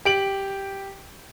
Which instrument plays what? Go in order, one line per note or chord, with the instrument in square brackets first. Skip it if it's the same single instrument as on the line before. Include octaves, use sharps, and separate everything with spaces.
[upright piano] G4 D7 F#7